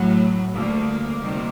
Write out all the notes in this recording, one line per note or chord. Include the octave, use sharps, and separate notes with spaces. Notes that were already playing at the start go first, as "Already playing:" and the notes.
Already playing: A2 F#3
D2 D3 G3 A#3
D2 C3 D#3 G3